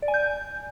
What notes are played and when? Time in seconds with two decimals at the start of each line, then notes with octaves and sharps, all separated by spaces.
0.02 D5
0.08 G#5
0.14 G6